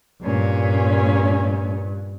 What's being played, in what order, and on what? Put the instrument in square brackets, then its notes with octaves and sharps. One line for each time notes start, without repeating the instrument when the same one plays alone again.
[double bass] G2 [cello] A#2 C#4